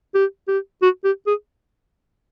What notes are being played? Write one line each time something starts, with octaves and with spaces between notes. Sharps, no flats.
G4
G4
F#4
G4
G#4